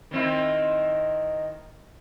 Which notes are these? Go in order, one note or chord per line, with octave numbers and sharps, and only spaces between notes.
D#3 C4 E4